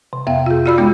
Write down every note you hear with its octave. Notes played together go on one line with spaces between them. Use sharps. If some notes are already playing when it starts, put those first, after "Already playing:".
C3
F2 B3 E5 F5 G5
F4 G#4
F4 F#4 D5 B5 E6
G#3 B3 D#4